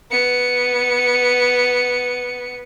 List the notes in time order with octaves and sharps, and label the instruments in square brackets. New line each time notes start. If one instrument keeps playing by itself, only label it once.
[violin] B3 C#7